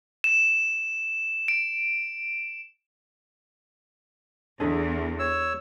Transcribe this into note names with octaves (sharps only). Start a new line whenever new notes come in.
E7
D7
E2 D4 G#4 A4
C#5 E6